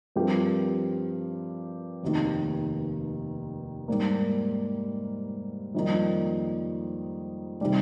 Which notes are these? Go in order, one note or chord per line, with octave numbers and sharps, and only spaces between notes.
G2 F3 C4 G4 A#4
F1 D#2 D#3
G#2 G3 A#3
F2 D#3 G3 A#3 D#4
C3 D#3 G3